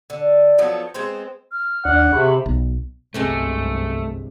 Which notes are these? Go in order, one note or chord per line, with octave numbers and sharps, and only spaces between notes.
D3
F3 F#3 A3 B3
G#3 B3 C4 C5
F6
D#2 D4 D5 F#5
C3 G#4 B5 C#6
B1
G1 C2 F#2 C3 G#3 A3 C4